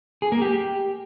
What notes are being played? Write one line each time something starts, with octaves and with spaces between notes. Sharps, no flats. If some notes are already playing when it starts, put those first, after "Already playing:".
G#4
A#3
G4